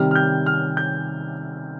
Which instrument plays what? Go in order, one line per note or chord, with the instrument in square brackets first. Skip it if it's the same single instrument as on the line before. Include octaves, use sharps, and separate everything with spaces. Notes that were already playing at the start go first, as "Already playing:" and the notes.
Already playing: [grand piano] C3 D#3 G3 F6
F6
G6
F6
G6